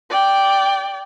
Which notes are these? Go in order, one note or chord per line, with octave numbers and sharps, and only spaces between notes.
D5 G5